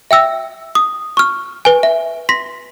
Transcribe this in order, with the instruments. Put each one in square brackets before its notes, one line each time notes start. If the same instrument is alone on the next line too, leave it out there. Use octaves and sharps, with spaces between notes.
[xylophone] E5 G5 E6 A#6
D#6
C#6 F6
B4 G#5
E5
C6 A#6 B6